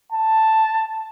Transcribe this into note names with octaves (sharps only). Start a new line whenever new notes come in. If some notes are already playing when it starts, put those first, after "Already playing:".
A5